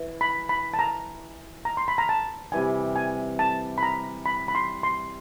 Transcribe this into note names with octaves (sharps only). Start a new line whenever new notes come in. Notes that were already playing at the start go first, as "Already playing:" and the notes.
Already playing: E3
B5
B5
A5
A#5
A#5
C6
B5
A#5
A5
C3 E3 G3 G#5
G#5
A5
B5
A#5
B5
B5
C6
C6